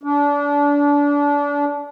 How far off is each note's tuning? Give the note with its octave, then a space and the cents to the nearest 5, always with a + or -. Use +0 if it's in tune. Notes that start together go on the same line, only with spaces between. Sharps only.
D4 -30